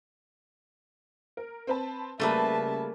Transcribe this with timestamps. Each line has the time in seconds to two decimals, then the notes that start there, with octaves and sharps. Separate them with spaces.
1.37 A#4
1.67 C4 B4 A5
2.20 C#3 G3 A3 A#3 B4 E5 A5